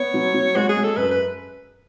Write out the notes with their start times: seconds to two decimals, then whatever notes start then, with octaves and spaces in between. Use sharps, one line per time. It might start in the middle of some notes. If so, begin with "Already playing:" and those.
Already playing: B3 C#5
0.14 F#3
0.34 F#3
0.56 G#3 F#4
0.69 G#4
0.77 G#3
0.84 A4
0.97 F#2 B4
1.11 B4